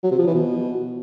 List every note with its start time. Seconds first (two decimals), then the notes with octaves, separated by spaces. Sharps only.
0.04 F#3
0.11 C3
0.19 F3
0.26 E3
0.34 B2